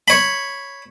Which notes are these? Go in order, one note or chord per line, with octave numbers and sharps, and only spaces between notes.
C#5 B5